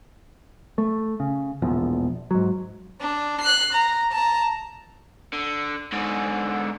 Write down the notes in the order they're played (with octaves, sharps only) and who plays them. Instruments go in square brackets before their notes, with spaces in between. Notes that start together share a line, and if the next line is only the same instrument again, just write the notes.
[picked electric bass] A3
C#3
E1 A#1 E2 F3
G#2 F#3
[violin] D4
F#6 C7
A#5
A5 A#5
[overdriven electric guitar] D3
G#2 D3